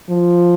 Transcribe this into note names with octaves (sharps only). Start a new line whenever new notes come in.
F3